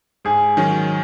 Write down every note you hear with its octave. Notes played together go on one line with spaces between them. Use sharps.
G#2 G#4
D#3 F#3 C#4